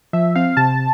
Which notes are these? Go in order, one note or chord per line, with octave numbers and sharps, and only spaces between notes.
F3 E5
C4 F5
C3 A5